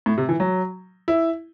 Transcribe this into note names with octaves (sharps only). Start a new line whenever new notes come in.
A2
C3
E3
F#3
E4